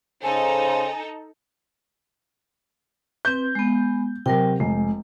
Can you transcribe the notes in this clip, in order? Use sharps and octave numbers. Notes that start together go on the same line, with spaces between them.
C#3 D#4 A4 C5 G#5
C4 B4 G6
G#3 B3
C3 F#3 A#4 G5
F1 G#3